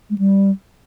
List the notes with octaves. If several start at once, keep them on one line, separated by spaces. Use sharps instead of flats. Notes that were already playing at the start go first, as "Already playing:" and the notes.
G#3
G3